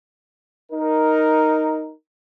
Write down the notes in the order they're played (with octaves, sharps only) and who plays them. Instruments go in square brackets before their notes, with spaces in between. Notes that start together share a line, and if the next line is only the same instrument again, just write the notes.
[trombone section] D#4 A#4